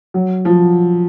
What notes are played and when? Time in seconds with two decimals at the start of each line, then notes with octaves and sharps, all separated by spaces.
0.14 F#3
0.45 F3